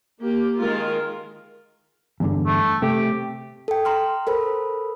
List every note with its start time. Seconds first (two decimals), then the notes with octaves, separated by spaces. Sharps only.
0.20 A#3 G4
0.59 D#3 G#3 F4 A#4
2.20 E2 G2 D3
2.46 A3
2.82 C3 A3 G4
3.68 A4 G5
3.85 A#5 C6 F6
4.27 A4 A#4 C5 B5